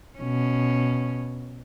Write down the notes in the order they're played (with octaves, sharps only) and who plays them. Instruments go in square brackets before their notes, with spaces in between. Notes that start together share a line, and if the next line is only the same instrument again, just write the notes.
[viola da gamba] B2 C#4